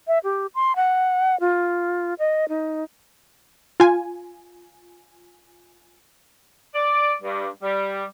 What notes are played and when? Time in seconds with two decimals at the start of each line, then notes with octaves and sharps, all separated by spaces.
0.07 E5
0.24 G4
0.55 C6
0.76 F#5
1.40 F4
2.19 D#5
2.49 D#4
3.80 F4 G#5
6.75 D5
7.21 G2
7.63 G3